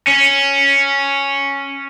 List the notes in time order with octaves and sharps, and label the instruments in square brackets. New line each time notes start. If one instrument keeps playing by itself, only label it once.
[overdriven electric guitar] C#4